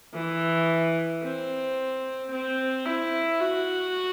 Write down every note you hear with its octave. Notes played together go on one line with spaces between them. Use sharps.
E3
C4
C4
E4
F#4